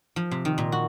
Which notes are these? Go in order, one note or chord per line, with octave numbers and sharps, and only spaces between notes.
F3
C3
D#3
A#2
F#4